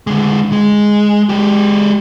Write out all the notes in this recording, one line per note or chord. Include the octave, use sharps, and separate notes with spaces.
D3 G#3
G#3
G#3 G4